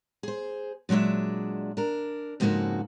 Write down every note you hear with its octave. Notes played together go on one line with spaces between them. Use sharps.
G#4 C5
A#2 F#3 G#3 D4 E5
D4 A#4
F2 G#2 C#3 A#3 F#4 A4